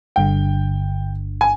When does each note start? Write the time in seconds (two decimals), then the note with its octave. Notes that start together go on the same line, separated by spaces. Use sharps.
0.16 G1 G2 D3 G5
1.41 G#5